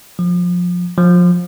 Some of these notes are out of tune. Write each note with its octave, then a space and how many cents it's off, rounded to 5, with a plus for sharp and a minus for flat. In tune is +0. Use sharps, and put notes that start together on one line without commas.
F3 +25
F3 +25